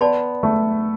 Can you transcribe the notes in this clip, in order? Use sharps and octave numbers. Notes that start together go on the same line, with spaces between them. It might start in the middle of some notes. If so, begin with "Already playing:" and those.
B3 A4 D5 A5 C6
A3